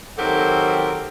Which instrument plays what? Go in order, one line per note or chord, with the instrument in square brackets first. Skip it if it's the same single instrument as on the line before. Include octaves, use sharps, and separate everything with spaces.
[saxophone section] D#3 F#3 C4 G4 A4 A#4